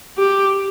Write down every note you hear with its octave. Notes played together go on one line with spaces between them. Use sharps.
G4